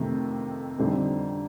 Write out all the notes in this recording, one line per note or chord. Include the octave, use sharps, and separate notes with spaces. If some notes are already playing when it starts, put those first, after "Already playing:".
Already playing: F2 C3 D#3 A3
F2 D3 G3 C4 D#4